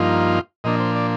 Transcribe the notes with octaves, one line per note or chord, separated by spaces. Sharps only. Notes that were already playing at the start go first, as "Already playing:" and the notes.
Already playing: G2 F3 A#3 D#4 F4
A#2 F3 A#3 D4 D#5
C5
D5